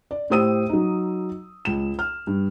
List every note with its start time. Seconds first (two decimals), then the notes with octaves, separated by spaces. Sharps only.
0.11 D5
0.30 A2 G4 C5 D#6 E6 D#7
0.69 F#3 D#4
1.65 C#2 E7
1.99 F6
2.27 G2